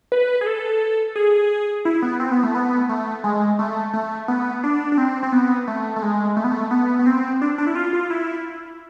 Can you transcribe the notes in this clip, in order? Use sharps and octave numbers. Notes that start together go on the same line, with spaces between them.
B4
G#4
A4
G#4
E4
B3
C4
B3
A3
B3
A3
G#3
A3
A3
B3
D4
D4
C4
C4
B3
A3
A3
G#3
A3
B3
A3
B3
B3
C4
D4
D4
E4
F4
F4
E4